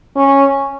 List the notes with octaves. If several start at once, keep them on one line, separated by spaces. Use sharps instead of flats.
C#4